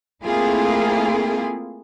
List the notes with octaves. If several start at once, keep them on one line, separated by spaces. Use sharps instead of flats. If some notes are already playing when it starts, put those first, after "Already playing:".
A3 A#3 C4 E4 F4 G#4